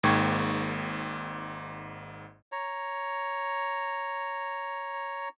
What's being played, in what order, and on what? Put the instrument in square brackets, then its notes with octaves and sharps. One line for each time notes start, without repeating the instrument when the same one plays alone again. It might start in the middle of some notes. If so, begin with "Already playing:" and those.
[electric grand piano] G#1 G#2 A#3 G5 C#6 G#6
[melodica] C#5 A#5